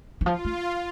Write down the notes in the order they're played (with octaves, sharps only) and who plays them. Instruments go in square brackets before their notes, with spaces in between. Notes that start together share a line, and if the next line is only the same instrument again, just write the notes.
[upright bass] E3
[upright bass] F3 [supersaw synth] F4
[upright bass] A3